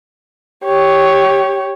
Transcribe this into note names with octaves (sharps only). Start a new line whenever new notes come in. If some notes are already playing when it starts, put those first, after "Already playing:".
G4 C#5